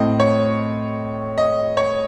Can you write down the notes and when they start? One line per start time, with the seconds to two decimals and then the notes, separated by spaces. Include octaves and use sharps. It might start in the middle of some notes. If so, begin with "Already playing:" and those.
Already playing: A2 A3 C4 D#5
0.20 C#5
1.38 D#5
1.77 C#5